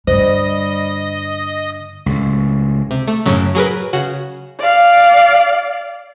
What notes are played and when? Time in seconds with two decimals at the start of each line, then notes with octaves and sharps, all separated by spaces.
0.07 G2 D3 G3 C5 D#5
2.06 C#2 A2
2.91 C3
3.08 A3
3.26 F#2 A2 C#3 F#3
3.55 F#3 G#4 A#4 B4
3.93 C#3 F#4
4.59 D5 F5